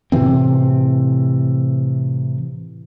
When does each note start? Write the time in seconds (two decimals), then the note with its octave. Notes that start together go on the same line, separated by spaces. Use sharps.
0.12 A2 C3 E3 C4